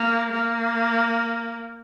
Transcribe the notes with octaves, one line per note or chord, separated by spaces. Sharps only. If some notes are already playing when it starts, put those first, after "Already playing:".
Already playing: A#3
A#3